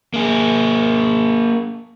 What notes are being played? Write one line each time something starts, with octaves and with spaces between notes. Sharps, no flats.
A#3 G#4